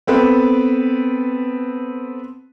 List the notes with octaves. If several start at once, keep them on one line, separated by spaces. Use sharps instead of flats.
B3 C4 A4 B4